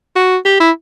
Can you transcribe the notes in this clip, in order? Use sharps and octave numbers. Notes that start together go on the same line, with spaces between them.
F#4
G4
E4